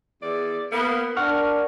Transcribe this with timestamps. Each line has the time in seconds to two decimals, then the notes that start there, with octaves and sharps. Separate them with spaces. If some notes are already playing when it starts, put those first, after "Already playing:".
0.22 E2 D5
0.72 A#3 B3
1.17 D4 A#4 F#5 C#6 F6